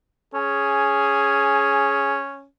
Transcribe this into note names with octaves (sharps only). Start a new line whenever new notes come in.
C#4 G#4